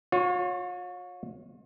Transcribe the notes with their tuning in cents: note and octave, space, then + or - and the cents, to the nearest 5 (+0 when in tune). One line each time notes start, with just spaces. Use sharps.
F4 +45 C#5 +0